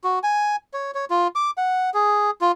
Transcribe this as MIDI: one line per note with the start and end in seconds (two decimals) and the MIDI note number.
0.04 0.19 66
0.23 0.56 80
0.74 0.91 73
0.95 1.05 73
1.10 1.28 65
1.35 1.51 86
1.57 1.90 78
1.94 2.31 68
2.41 2.52 65